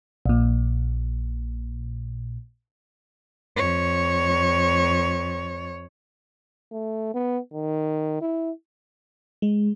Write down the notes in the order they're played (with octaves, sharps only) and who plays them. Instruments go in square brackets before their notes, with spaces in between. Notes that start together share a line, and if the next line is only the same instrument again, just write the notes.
[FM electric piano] A#1 A#2
[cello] F2 C#5
[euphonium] A3
B3
D#3
E4
[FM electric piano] G#3